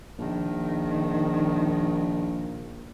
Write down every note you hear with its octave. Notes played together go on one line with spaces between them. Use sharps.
A#1 D#3